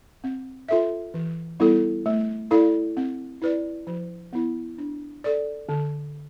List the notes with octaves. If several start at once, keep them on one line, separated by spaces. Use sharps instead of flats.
C4
F4 A4 E5
E3
G3 B3 E4 A4
A3
E4 A4 D5 F5
C4
E4 B4 D5
F3
B3 E4
D4
A4 D5
D3